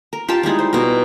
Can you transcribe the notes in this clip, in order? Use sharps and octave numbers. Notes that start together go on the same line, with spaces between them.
A#4
F4 G4 A#4 A5
G3 G#3 D#4 E4
C5
B2 A#4